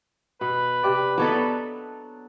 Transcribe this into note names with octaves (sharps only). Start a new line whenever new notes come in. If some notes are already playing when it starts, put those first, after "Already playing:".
B2 B4
C3 G4 D5
F#3 B3 D4 A4 C#5 D#5